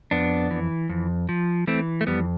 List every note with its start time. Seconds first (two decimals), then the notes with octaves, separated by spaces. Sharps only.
0.11 F2 B3 D4
0.51 E3
0.89 F2
1.29 F3
1.67 E3 A3 C4
2.01 A3
2.07 F2 G3 B3